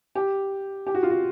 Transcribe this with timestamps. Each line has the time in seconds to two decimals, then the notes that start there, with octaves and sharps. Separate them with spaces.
0.15 G4
0.87 G4
0.95 F#4
1.03 F4
1.10 F#4